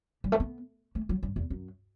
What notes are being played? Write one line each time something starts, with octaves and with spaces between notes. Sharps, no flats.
G3
A3
B3
A3
F#3
G2
E2
F#2